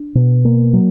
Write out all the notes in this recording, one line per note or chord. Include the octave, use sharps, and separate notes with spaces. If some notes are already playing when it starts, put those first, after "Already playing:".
Already playing: D4
B2
A#3
F#3